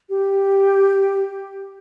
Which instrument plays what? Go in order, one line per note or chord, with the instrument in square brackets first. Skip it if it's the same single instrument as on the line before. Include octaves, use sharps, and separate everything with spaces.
[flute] G4